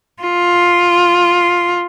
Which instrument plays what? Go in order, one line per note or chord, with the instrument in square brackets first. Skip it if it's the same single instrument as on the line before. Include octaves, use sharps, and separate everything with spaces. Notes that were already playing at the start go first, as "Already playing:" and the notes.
[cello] F4